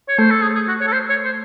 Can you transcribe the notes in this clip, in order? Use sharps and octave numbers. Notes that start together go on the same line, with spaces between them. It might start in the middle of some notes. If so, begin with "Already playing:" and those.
C#5
A3 C5
A4
G#4
G#4
F#4
C#5
A4
C5
C#5
C5